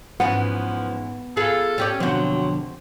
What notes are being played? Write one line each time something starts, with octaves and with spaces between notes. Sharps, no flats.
G#2 E3 F3 B3 C#4
F4 G#4 A4 B4
C#4 G4 D5
F2 B2 D3 F#3 C4 F#4